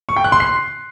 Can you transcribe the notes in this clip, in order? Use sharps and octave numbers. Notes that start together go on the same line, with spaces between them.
C#6
G5
F#6
C6
C7